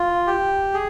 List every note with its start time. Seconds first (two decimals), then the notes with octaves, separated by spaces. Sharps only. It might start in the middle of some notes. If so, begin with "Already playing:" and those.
Already playing: F4
0.27 G4
0.74 G#4